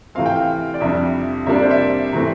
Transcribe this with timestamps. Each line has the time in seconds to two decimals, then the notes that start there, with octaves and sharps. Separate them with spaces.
0.15 C3 E3 A3 C4 F5
0.26 G5
0.36 F5
0.74 D5
0.81 F2 C3 G3 D4 E5
1.46 C3 G3 A#3 D4 E5
1.54 D5
1.63 C5
1.71 E5
2.13 C3 E3 A3 C4